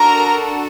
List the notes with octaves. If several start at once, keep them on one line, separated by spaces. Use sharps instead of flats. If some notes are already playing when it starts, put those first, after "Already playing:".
Already playing: D4 F#4 A4 A#4 A#5